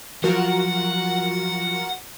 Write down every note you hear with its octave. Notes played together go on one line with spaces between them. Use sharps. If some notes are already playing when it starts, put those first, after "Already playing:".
F3 F#3 F4 F#4 A#4 F#5